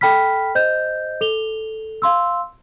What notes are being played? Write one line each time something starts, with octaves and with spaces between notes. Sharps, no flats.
A4 G5 B5 F6 B6
C5 D#5 G6
A4 F7 G7
F5 C6 E6